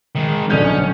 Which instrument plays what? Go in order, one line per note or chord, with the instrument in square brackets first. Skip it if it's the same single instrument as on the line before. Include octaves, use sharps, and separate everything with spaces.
[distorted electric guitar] G#2 D#3
[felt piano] B1 D3 G6 [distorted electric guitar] C#4